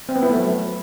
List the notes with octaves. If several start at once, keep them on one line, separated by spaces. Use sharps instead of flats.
C4
B3
E4
A3
F#3